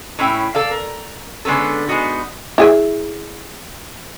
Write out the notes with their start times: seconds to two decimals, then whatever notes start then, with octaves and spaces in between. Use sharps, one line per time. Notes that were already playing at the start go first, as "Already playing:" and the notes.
0.19 A2 C#4 E4 G5
0.55 A4 D5 F5
0.71 A#4
1.45 D3 G#3 B3 C#4 A4
1.88 G#3 B3 D#4 F#4
2.58 E4 G#4 E5